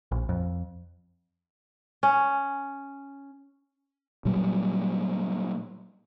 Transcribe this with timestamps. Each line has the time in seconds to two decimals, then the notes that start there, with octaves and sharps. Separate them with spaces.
0.12 A#1
0.29 F2
2.03 C#4
4.25 A#2 F#3 G3